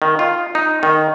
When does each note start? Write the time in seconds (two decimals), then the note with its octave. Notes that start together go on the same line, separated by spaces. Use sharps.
0.02 D#3
0.19 F4
0.55 D#4
0.83 D#3